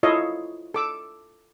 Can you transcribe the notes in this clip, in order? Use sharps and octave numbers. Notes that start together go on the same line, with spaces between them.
E4 F4 A4 C#5 D#5 F5
A4 D6 E6